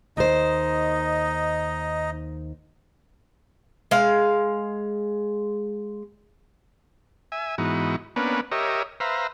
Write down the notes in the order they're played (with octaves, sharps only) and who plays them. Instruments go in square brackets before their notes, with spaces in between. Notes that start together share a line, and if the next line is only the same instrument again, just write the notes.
[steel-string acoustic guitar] D#2 C5 [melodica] D#4 D#5
[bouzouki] G#3 F5
[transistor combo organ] E5 G#5
G#2 E3 B3 D#4 F#4
A#3 B3 C#4 D4 B4
G4 A#4 C#5 D#5 E5
B4 C5 E5 F5 A#5